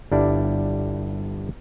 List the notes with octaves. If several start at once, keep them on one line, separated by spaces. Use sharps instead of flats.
G1 G3 D4 E4 D5